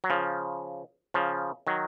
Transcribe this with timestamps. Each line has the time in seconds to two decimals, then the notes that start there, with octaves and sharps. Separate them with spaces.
0.04 F#3
0.10 C#3 F3
1.14 C#3 F3
1.67 D#3 F#3